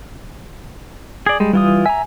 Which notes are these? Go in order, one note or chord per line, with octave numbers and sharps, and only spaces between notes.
G#4 D5
G3 G#3
E3 G3 F4 D#6
E5 G#5 A#5